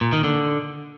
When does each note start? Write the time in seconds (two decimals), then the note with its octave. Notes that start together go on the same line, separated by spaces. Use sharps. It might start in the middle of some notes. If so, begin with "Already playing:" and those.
0.01 A#2
0.13 D#3
0.24 D3